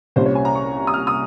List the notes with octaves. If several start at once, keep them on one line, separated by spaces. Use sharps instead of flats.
C2 A#2 G3 C#4 C5
C#5
G#5
A#5
C#6
D#6
F6
D#6